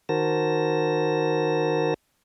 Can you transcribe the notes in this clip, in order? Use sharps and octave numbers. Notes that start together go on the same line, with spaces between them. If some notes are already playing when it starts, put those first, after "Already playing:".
D#3 F#4 A#4 C5 A5 A#6